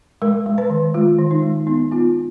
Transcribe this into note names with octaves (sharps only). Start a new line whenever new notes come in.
G#3 A#4
G#3
B4
D#3
G#3 F4
D#3
D#4
G#3
B3 D#4
B3 F4